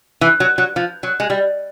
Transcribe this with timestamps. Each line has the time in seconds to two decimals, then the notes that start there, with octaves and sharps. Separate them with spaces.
0.21 E3
0.40 F#3
0.58 F#3
0.76 F3
1.03 F#3
1.20 G#3
1.30 G3